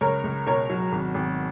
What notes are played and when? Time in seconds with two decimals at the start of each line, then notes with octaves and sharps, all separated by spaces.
0.01 C#2 A#4 C#5
0.24 C#2
0.47 B2 A#4 C#5
0.70 F#3
0.92 G#1
1.14 G#1